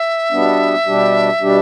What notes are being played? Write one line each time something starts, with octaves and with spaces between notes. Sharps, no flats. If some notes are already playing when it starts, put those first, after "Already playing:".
Already playing: E5
B2 G3 B3 D4
B2 G3 D4 G4
B2 G3 D4 G4